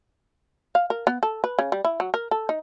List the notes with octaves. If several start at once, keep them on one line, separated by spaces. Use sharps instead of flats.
F5
A#4
B3
A4
B4
C#3
G3
E4
F#3
A#4
A4
D#4